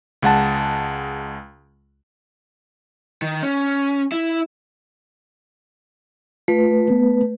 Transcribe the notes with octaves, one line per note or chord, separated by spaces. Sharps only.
C#2 G#3 F#5 A5
D#3
C#4
E4
A3 F4 B4
B3